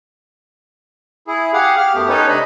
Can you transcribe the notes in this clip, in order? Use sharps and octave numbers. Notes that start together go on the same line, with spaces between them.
E4 G#4
G4 G#4 F5 F#5
G4 F6
F#2 A3 B3 G4
C#4 D#4 A4 B4 C#5
C3 G#3 D4 D#5 B5